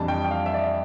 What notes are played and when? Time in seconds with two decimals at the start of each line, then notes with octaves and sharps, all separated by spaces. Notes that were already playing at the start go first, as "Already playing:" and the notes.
Already playing: F2 E3 G3 D4 A5
0.08 G5
0.24 G5
0.31 F5
0.46 E5
0.54 D5